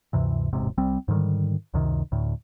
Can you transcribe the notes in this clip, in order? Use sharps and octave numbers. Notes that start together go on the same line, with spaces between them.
D2 G2 C3 E3
E1 A1 G#2 C3
C2 G3 C4
G#2 D3 D#3 G3
C#2 F#2 C3 D#3
D2 A2